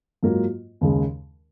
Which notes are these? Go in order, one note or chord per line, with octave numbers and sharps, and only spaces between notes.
G#2 F#3 A#3 F4
D#2 C#3 G#3